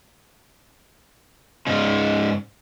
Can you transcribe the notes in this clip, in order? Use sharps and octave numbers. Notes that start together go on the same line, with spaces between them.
G#2 C#3